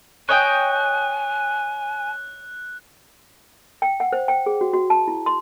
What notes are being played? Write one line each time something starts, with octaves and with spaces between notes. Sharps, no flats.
C#5 D#5 G5 G#5 F#6
G5
F#5
C5
G5
G#4
F#4
F#4
A5
E4
C6